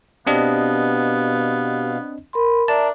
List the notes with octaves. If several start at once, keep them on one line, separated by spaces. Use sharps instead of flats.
B2 B3 C4 D4 G4 D#5 F5
A#4 B5 C6
D4 A#4 D5 E5 A5